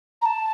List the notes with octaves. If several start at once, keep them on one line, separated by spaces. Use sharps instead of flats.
A#5
A5